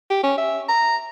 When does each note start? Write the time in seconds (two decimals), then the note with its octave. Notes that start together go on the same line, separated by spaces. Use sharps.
0.10 G4
0.23 C#4
0.38 E5
0.69 A#5